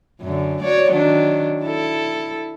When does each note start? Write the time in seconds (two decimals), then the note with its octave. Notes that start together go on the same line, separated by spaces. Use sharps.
0.21 F#2 D3
0.62 F#4 C#5 D5
0.91 D#3 F#3 D4
1.63 E4 A4